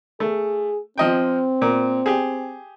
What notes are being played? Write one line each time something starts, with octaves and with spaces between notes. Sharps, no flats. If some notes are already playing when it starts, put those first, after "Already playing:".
A3 G#4
F3 C4 D#5 G5
A#2
G4 G#4